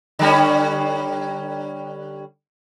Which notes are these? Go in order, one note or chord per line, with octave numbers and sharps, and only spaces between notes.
D3 G3 C#4